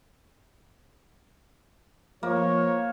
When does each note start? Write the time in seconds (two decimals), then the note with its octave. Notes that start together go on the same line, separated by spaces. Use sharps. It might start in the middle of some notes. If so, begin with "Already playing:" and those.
2.23 F3 A#3 C#5